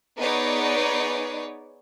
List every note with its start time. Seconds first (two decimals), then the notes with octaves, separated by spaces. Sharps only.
0.18 B3 D#4 G#4 B4 C#5 D5